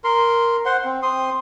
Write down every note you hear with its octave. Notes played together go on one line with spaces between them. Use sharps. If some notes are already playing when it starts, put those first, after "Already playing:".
A#4 C6
C5 F#5 C6
C4
C4 C6 D#6